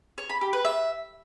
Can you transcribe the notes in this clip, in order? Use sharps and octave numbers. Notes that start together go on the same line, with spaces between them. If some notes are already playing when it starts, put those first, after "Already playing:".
C#5
B5
G4
B4
E5